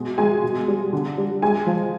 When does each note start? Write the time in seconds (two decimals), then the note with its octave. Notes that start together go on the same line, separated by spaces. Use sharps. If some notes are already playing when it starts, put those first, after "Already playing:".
Already playing: B2 G#3
0.18 G#3 G#5
0.44 B2
0.68 G3
0.93 D3
1.18 G3
1.42 G#3 G#5
1.67 F3